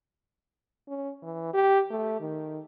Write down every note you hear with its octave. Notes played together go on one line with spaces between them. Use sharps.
C#4
E3
G4
A3
D#3